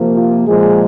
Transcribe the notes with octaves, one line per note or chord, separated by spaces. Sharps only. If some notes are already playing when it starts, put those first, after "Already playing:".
Already playing: C3 F3 A#3
F4
A#2 F3 G#3 G#4